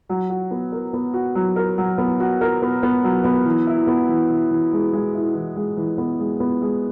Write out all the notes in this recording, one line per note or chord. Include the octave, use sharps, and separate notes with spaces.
F#3
F#4
B3
A#4
B3
F#4
F#3
A#4
F#3
B3
F#4
A#4
B3
B3
F#3
B3
E3
E4
B3
E3
E3
E3
G#3
G#3
E4
E3
G#3
E3
B3
G#3
B3
G#3